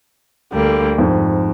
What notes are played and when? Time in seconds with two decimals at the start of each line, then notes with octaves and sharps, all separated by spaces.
0.53 D2 D3 G3 A#3
0.98 F2 G#2